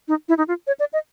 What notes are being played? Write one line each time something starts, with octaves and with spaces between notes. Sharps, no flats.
D#4
E4
D#4
F4
C#5
D5
D#5